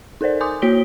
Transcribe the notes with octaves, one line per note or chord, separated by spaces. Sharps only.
D#4 A4 A#4 C5 D5
G#5 C6 D6 D#6 G6
A#3 F#4 C#5 B6 D7 G7